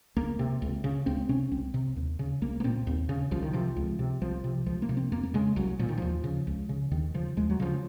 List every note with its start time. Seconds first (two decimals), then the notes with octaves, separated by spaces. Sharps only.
0.16 C#2 A#3
0.39 C3
0.62 C#2
0.84 C#3
1.06 C#2 C4
1.29 C3 C#4
1.51 C2 C4
1.74 C3
1.96 D#2
2.19 C#3
2.42 C2 A#3
2.60 A#3
2.64 A#2 C4
2.87 D#2
3.09 C#3
3.31 C2 F3
3.43 D#3
3.53 C3 F3
3.77 C#2
3.99 C3
4.22 C2 F3
4.44 C3
4.66 C#2 F3
4.82 A#3
4.89 C3
4.97 C4
5.12 F2 A#3
5.23 A#3
5.34 C#3 G#3
5.56 C2 F#3
5.79 A#2 F3
5.89 D#3
5.98 D#2 F3
6.24 C#3
6.47 C#2
6.69 C#3
6.91 D#2 D#3
7.14 C#3 F3
7.37 D#2 G#3
7.50 F#3
7.60 C#3 F3